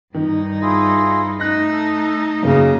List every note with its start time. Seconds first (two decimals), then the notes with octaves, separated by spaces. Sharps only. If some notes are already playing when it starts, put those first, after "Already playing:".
0.14 G2 D#3 D#4
0.62 E4 F4 G#4
1.40 A3 D#4 D#5 F#6 A#6
1.71 A4
2.43 F#2 C#3 A#3 A#5